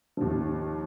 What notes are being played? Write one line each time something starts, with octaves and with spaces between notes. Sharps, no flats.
D#2 F3